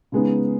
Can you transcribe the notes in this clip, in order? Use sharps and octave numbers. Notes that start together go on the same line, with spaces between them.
C#3 G#3 B3 D#4